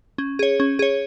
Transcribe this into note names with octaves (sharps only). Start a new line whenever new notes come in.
C#4
G#4 C#5
C#4
G#4 C#5